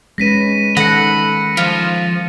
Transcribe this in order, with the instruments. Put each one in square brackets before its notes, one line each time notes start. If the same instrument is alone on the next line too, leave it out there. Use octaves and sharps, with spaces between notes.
[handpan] G#3 C#4 B4 [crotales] A#6 B6 D#7
[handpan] D#3 A4 [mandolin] F#5 [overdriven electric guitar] B5 [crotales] A#6 C#7
[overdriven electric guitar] F3 [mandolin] F4